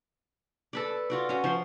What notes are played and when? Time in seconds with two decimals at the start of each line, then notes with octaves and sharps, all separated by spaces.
0.73 A4 B4 D5
1.10 F4 F#4 D5
1.29 C#4 F#4
1.44 F3 C6